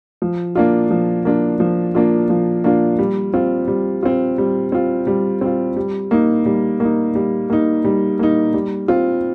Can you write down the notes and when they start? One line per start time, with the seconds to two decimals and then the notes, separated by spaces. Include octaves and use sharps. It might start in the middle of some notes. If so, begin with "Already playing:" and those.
0.22 F3
0.55 A#3 D4 F4
0.91 F3
1.25 A#3 D4 F4
1.60 F3
1.95 A#3 D4 F4
2.30 F3
2.64 A#3 D4 F4
2.99 G3
3.34 C4 F4
3.68 G3
4.03 C4 F4
4.38 G3
4.72 C4 F4
5.07 G3
5.41 C4 F4
5.76 G3
6.11 A#3 D#4
6.46 G3
6.80 A#3 D#4
7.15 G3
7.50 A#3 D#4
7.84 G3
8.19 A#3 D#4
8.53 G3
8.88 C4 F4